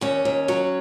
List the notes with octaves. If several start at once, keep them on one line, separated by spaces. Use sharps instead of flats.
D#2 C#4
D#2
F#3